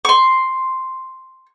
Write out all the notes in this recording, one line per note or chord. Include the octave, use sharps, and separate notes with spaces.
C6 C#6